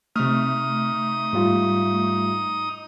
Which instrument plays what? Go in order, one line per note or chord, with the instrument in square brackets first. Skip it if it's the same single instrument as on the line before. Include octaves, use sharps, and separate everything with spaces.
[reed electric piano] C3 F6 [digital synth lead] A3 [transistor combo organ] D#4 D#6
[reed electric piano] G#2 G3 F4